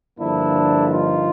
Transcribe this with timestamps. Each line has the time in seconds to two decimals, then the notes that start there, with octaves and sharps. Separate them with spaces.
0.18 G2 D3 F3 A#3 D4 E4
0.92 D#4 F4